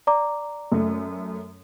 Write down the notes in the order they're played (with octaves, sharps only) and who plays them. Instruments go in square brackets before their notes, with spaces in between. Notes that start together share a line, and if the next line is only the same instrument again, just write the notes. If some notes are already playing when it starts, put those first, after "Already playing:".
[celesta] D5 A#5 D6
[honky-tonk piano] F#2 A3